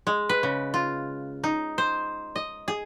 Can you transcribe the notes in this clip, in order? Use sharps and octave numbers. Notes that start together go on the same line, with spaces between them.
G#3
B4
C#3
F4
D#4
C5
D#5
G#4